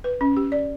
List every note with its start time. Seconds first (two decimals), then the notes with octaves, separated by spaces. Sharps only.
0.04 B4
0.21 C#4
0.37 G4
0.52 D5